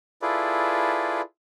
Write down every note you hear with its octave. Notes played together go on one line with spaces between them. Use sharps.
E4 F4 G#4 A4 B4 D5